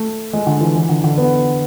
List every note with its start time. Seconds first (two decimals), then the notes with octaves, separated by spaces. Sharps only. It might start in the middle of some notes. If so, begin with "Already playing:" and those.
Already playing: A3
0.33 G#3
0.47 D3
0.61 E3
0.75 E3
0.89 D3
1.04 D3
1.18 B3